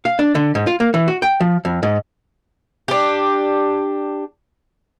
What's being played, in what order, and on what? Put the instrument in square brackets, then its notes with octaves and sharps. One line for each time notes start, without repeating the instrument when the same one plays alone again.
[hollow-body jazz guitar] F5
D4
D3
G#2
F4
A#3
E3
F#4
G5
F3
F2
G#2
[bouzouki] D4 G4